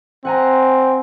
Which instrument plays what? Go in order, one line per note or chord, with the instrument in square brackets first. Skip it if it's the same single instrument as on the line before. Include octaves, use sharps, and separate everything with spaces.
[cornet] C4 [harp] F#5 G#5 A#5